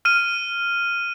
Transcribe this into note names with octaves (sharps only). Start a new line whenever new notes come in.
F6 D#7